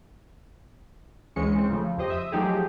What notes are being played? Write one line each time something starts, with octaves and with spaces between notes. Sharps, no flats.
D2 E3 G#3 C#4 C#7
G#3 C4
C#3 F3 A3
F2 G4 C5 D#5
E5 D#6
F3 F#3 A3 D#4 G4 G#4